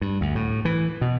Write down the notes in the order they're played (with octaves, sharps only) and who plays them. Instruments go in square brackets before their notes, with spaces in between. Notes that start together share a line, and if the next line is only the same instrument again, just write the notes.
[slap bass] G2
D2
A2
E3
B2